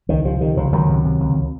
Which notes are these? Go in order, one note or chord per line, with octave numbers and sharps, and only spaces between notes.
C#2 D#3
C3 F3
C3 D#3
C#2 F3
C#2 D#3 F#3
C3
C3
C#2